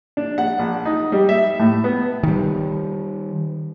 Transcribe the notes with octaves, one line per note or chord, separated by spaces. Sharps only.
D4
F#5
A#1
D#4
G3
E5
A2
B3
D#3 G3